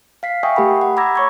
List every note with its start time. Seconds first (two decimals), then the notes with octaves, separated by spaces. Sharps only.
0.23 F5 B6 C7
0.43 E5 G5 G#5 C#6 D#6
0.56 A3 G4 A#4 F#5 B5
0.81 F#5
0.96 A#5 B5 D6 E6 G#6 A#6
1.16 C#5 C#6 G#6